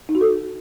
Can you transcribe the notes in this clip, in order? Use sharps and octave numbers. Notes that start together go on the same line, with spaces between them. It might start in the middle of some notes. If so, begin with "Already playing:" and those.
D#4
F#4
A4